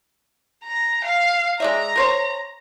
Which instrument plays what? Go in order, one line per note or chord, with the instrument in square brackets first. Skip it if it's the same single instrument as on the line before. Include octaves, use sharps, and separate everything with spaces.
[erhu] A#5
F5
[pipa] G#3 D5 E5 [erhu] A#5
[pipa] A#4 C5 C#5